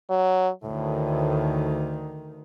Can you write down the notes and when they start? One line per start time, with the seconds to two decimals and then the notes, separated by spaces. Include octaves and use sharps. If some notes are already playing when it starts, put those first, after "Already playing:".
0.10 F#3
0.64 D2 A2 D#3